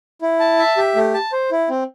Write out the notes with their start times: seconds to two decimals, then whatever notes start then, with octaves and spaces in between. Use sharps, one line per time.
0.22 E4
0.40 A5
0.59 E5
0.77 G4
0.95 A3
1.14 A5
1.32 C5
1.51 E4
1.69 C4